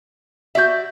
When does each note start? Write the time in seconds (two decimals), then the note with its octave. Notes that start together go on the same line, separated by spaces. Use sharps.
0.55 F#4 D5 E5 G6